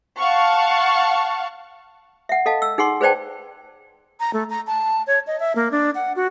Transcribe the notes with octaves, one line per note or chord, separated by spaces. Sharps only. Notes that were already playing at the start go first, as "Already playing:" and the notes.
F5 F#5 A5 C#6
E5 F#5
A4 D#5 F5 A5
E6
D#4 G#4 F#5 C6 C#6
G#4 B4 C5 D5 G5 A5
A#5
A3
A#5
A5
C#5
D#5
E5
A#3
D4
F#5
F#4